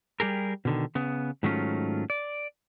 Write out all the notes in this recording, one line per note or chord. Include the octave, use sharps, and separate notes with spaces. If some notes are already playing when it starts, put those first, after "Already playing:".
G3 G4 G#4 A#4
B2 D3 D#3
C#3 B3
G#2 D#3 F#3 A3 C#4 F4
D5